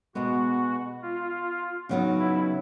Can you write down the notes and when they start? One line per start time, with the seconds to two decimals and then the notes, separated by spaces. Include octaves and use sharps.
0.15 B2 G#3 B3 F#4
1.02 F4
1.89 C#3 F#3 B3 D#4
2.19 E4